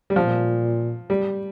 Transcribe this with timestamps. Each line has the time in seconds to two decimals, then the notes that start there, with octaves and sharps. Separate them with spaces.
0.10 G3
0.16 A#2 F3
1.10 G3